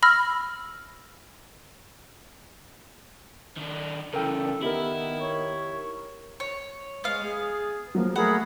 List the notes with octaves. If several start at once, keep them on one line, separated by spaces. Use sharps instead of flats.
B5 E6 F6 A#6
D#3 D4
C#3 E3 A4 A#4 G5
D#3 B3 E4 G4 A#4
C#5
C#5
G#3 B3 F5
G#4
F3 F#3 A#3
A3 G#4 A#4 F#5 B5